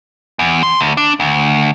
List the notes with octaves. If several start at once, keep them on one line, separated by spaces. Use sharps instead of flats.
E2
C6
D2
D4
D2